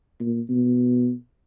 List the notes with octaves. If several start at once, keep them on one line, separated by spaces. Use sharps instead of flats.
A#2
B2